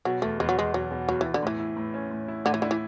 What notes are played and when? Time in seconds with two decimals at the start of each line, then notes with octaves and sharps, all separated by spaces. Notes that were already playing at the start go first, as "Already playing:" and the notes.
0.05 B2 F#3
0.22 E2 A3
0.40 E2 G#3
0.49 F#3
0.57 E2 G#3
0.74 B2 F#3
0.91 B2
1.08 E2 F#3
1.21 E2 E3
1.34 D3
1.43 A2 E3
1.60 E4
1.77 A2
1.94 C#4
2.11 A2
2.28 E4
2.45 A2 D3
2.54 E3
2.62 D3 E4
2.71 E3